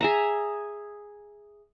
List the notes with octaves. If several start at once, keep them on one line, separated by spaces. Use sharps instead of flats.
G#4 E5 A#5